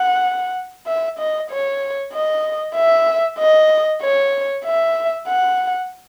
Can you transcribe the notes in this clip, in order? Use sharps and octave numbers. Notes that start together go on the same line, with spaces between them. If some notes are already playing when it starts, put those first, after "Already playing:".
Already playing: F#5
E5
D#5
C#5
D#5
E5
D#5
C#5
E5
F#5